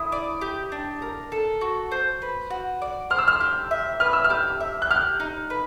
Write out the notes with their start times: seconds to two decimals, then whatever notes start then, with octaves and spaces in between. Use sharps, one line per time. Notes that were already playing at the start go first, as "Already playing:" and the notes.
Already playing: E4 D#6
0.12 D5
0.41 G4
0.72 D4
1.02 A#4
1.32 A4
1.61 F#4
1.92 C5
2.22 B4
2.50 F#4
2.82 D5
3.10 C5 F6
3.18 E6
3.28 F6
3.40 G4
3.71 E5
4.00 B4 F6
4.13 E6
4.24 F6
4.30 G4
4.60 E5
4.82 F#6
4.91 G4 F6
5.20 D#4
5.50 B4